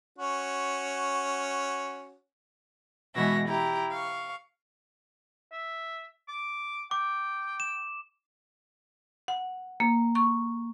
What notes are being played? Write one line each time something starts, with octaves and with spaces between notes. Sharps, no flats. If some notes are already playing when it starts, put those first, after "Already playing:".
C#4 F#4
B2 E3 G#3 F#4 E5 A#6
E4 G4 A#5
F5 C#6
E5
D6
G5 D6
E7
F#5
A#3
C#6